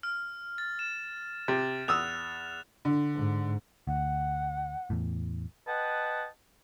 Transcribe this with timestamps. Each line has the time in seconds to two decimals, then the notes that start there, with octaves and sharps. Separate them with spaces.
0.03 F6
0.58 A6
0.79 E7
1.48 C3 A6
1.88 E2 D#6 E6 F#6 F7
2.85 D3
3.15 G#2
3.87 D2 F#5
4.90 E2 A2
5.67 B4 D#5 F#5 G5 A5